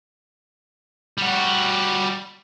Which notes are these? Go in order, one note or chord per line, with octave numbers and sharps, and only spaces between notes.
G3 F#4